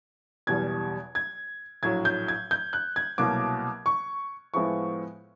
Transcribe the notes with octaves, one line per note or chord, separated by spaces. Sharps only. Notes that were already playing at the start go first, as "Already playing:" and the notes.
F#1 E2 B2 G3 G#6
G#6
A#1 A2 F#3 G#6
G6
G#6
G6
F#6
G#6
C2 B2 F#3 A#3 D6
C#6
A2 F3 G#3 B3 E4 C#6